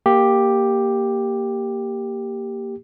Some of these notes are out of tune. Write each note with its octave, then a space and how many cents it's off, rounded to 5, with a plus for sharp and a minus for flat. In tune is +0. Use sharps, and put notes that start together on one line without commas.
A#3 +0 G4 +5